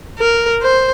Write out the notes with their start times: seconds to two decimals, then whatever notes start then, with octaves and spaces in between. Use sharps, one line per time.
0.19 A#4
0.62 C5